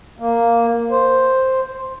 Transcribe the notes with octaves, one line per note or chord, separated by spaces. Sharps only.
A#3
C5